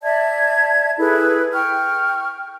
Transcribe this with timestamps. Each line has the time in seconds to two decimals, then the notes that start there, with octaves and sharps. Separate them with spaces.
0.03 D5 E5 A5 G#6
0.99 E4 G#4 A4 B4
1.53 G5 C#6 F6